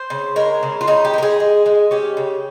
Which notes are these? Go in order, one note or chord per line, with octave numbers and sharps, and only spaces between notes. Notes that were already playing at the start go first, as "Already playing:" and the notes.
Already playing: C5
C#3
G#3 A#4
C#3
F4
C#3 D#4
G4
G#3 A#4
G#4
G#3
G#3
C#4 G4
C#3